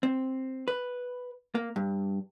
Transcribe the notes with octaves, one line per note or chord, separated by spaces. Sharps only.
C4
B4
A#3
G2